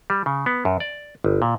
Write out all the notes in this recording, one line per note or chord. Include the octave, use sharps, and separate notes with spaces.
G3
C#3
B3
F#2
D5
G1
A#2